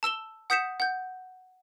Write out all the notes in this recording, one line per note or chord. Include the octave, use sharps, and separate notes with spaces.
A5 E6 E7 G7
F#5 D#6 G6 B6 C#7 E7
F#5 G6